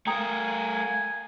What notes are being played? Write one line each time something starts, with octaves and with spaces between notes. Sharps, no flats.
A3 A#4 G5 G#5 A#5 D#6